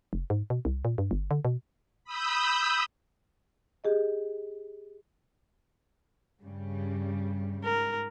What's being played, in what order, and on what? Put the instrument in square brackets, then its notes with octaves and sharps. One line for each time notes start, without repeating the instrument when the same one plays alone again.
[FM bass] F1
G#2
B2
C2
A#2
G2
G1
D3
B2
[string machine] B5 D#6 E6 G6
[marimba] G4 G#4 D#5
[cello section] G2 C#3 G3
[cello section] G#2 [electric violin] A#4